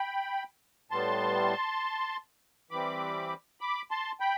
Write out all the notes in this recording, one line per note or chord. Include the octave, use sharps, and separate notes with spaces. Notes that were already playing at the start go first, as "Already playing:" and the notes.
Already playing: G5 B5
A2 G3 B3 A5 C6
E3 G3 C4 B5 D6
B5 D6
A5 C6
G5 B5